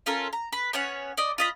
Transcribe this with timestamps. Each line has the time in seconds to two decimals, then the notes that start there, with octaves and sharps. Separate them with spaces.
0.06 C#4 F4 A4 A#4
0.33 A#5
0.52 B4
0.73 B3 C#4 C#5 F#5
1.17 D5 D#5
1.38 F4 D#5 B5